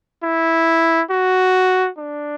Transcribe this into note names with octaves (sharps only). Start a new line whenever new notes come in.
E4
F#4
D4